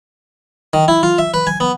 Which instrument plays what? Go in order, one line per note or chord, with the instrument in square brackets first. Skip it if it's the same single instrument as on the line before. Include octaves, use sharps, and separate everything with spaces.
[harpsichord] D#3
E4
F4
E5
B4
G#5
B3